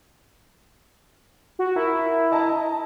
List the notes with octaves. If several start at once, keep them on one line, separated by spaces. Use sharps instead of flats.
F#4
E4 A#4
D#5 A5 A#5